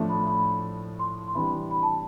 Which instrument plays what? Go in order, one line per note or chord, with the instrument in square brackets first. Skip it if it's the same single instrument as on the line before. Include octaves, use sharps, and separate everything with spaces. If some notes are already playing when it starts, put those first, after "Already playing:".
Already playing: [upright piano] A2 F3 A3 D4
[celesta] B5
B5
C6
C6
[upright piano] C3 E3 G3 D4 [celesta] B5
[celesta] B5
A5